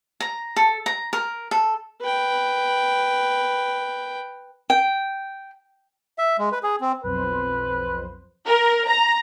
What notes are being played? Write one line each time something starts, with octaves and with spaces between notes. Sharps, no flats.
A#5
A4
A#5
A#4
A4
B4 G5
G5
E5
G#3
B4
G#4
C4
B1 F2 B4 C5
A#4
A#5